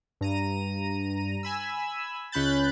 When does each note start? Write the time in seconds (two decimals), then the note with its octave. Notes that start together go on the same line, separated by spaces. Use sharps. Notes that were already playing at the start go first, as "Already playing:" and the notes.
0.21 G2 A#5 D#7
1.43 G#5 B5 E6
2.32 C#2 C#4 B5 F#6 G6 A6